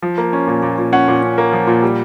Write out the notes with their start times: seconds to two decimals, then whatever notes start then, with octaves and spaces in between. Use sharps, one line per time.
0.02 F3
0.18 A#3
0.33 C#4
0.47 A#2
0.62 A#2
0.78 A#2
0.93 C#4 F#5
1.08 A#2
1.23 C#4
1.38 A#3
1.53 F3
1.67 A#2
1.83 G3